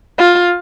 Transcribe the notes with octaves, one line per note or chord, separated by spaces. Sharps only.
F4